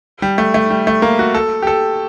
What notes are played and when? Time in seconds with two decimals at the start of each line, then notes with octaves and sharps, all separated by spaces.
0.22 G3
0.38 A3
0.54 A3
0.70 G3
0.87 A3
1.02 A#3
1.19 F#4
1.34 A4
1.62 G4
1.67 A4